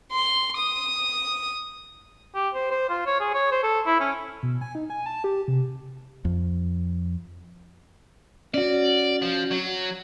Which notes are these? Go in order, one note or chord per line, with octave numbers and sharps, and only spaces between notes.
C6
D#6
G4
C5
C5
F4
C#5
G#4
C#5
C5
A4
E4
C#4
B2
G#5
D#4
G#5
A5
G4
C3
F2
C#4 F#4 D5
F3
F#3